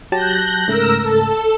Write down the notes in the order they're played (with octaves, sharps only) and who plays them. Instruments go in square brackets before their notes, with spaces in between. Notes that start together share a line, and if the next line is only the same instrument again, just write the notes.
[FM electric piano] F#3 G4 A5 [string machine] F#6 G6 A#6
[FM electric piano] G#2 C#3 A3 [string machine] A#4 E6 A#6
[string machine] A4